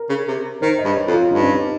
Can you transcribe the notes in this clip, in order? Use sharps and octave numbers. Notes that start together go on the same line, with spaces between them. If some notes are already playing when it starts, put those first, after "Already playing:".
Already playing: A#4
C#3
C3
D#3 C5
D#5
G2
C#5
F2
F4
G2 D#4
C#4
D#4